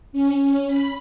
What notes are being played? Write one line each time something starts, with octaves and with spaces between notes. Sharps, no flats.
C#4
B5